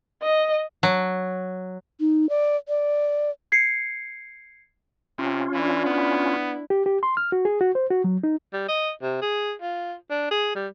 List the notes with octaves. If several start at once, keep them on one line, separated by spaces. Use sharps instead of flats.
D#5
F#3
D#4
D5
D5
G#6 C7 C#7
C3 C#4 F4
E3 D4 E4
B3
G4
G4
C6
F6
F#4
G#4
F#4
C5
F#4
F#3
D#4
G3
D#5
C3
G#4
F4
D4
G#4
G3